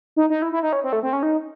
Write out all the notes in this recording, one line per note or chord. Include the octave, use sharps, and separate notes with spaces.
D#4
D#4
E4
E4
D#4
C#4
C4
A3
C4
C#4
D#4